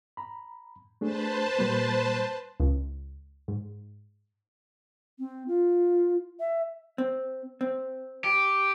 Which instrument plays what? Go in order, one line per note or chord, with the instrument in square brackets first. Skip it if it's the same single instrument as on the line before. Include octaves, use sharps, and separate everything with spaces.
[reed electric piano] A#5 B5
[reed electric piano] A3 D4 G#4 [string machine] B4 C5 A5
[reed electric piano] A#2 G3 A#3
[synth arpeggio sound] C#2
G#2
[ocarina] C4
F4
E5
[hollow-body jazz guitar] C4
C4
[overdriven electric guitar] G4